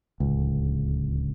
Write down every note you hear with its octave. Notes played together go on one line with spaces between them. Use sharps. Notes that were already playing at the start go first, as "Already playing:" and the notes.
D1 C#2